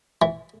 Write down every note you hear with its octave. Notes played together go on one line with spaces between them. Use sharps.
E3